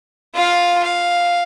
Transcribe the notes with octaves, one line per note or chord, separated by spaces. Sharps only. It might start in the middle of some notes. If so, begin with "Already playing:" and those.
F4 F5
F5